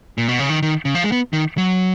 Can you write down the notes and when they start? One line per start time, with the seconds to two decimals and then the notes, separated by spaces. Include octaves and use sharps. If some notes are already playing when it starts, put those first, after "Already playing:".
0.18 A#2
0.28 B2
0.39 C#3
0.50 D#3
0.63 D#3
0.85 C#3
0.95 F3
1.04 G#3
1.12 B3
1.33 D#3
1.57 F#3